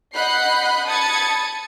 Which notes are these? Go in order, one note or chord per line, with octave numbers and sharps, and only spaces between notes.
D#5 F#5 B5 F#6 G6 C7
A5 B5 D#6 G#6 A6 C#7